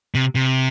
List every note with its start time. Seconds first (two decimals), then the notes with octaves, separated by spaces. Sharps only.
0.15 C3
0.35 C3